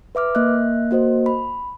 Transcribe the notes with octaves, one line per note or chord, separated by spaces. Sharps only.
B4 E5 D6 F6
A#3 D#5 E5 F#6
A#3 F#4 C5 D#5
B5